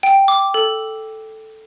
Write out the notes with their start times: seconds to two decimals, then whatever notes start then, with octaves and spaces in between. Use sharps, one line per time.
0.03 G5
0.28 D6
0.54 A4